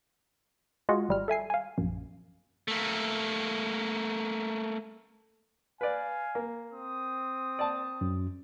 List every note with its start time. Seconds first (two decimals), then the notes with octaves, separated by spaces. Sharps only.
0.89 G#3 F4 F#4 G#4 D#5 F#5
1.09 G#1 G3 F6
1.28 A4 E5 G#5 C7
1.50 F5 G#5
1.78 A#1 F#2
2.68 A3 A#3
5.81 B4 D5 F5 G#5
6.35 A#3
6.73 C4 D#6
7.59 D5 A5
8.01 F#2